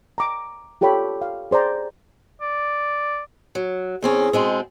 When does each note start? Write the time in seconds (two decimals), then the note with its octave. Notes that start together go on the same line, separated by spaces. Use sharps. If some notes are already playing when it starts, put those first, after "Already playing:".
0.18 A#5 D6
0.81 F4 G4 A4 C#5 G5 B5
1.21 F5
1.51 G#4 C5 D5 A#5
2.42 D5
3.55 F#3
4.02 E2 C4 C#4 G#4
4.33 B2 G#3 C4